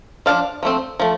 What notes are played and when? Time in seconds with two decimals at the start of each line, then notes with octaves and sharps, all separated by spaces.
0.26 F3 D4 F5 A5
0.63 F3 A3 C4
1.00 F3 A3